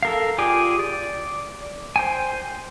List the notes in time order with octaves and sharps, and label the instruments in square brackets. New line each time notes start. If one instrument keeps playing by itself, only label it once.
[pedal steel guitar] A4 A#4 F5
F4 G4 G#4 D5 G#5
D5
C5 G5 G#5